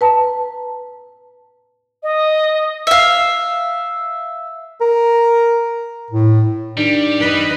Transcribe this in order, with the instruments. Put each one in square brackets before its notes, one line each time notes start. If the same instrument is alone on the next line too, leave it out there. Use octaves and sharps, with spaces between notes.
[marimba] B4 A5 A#5
[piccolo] D#5
[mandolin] E5 F5
[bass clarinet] A#4
A2
[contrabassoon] D#3 [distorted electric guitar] G3 [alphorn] D4
[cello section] B4 D#5